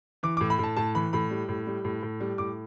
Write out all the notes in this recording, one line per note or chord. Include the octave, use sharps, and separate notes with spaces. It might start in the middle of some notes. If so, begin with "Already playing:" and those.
E3 D6
A2 D6
B5
A2 A5
A2 A5
E3 B5
A2 B5
G3
A2
G3
A2
A2
G3
A2 D6